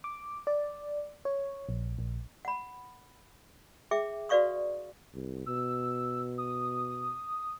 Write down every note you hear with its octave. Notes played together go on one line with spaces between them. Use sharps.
D6
D5
C#5
A#1
A#1
F#5 B5
G#4 E5 G5 D6
F#4 B4 D5 F5 C#6 D#6
C2
B2 E6
D#6